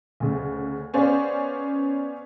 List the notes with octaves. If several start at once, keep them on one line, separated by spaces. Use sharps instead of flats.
D2 C#3
B3 C#4 G#4 C5 D5 F5